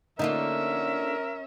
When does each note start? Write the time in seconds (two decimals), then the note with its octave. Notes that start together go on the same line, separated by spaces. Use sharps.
0.19 D3 A#3 C#4 D#4 F4 A#4 E5